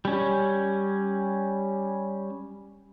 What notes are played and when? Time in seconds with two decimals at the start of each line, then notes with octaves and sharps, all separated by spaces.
0.05 G3 C#4